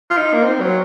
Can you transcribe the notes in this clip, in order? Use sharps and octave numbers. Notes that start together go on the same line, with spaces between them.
F4
D#4
A#3
C4
F#3